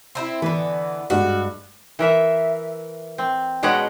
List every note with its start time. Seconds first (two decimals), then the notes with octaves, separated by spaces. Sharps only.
0.15 C4 D#4 E4
0.42 D3 E3 B3
1.10 G2 G#3 F#4
1.99 E3 A#4 E5
3.18 C4
3.63 B2 G#3 C#4 D#5 F#5 A#5